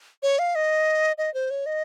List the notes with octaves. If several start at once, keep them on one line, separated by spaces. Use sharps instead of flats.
C#5
F5
D#5
D#5
C5
C#5
D#5